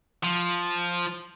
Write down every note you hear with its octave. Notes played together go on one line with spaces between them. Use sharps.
F3